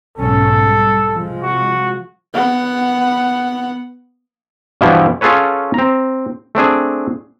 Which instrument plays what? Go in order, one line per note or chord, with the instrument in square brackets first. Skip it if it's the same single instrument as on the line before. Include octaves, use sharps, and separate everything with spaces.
[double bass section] B1 G#2 C#4 [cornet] A4
[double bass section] G3
C3 F3 G#3
[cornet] F#4
[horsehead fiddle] B3 F#5
[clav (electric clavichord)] G2 B2 E3 F3 E4
C#4 F4 G#4 A4 B4 C#5
C4 A#5
A3 C4 D4 G#4